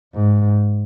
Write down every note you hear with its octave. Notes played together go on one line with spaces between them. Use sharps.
G#2